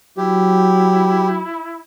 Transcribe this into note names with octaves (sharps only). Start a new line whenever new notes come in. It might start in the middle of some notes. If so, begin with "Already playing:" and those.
F#3 E4 G4